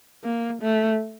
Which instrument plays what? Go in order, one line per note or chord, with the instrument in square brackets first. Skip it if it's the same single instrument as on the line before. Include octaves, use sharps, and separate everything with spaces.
[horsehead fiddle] A#3
A3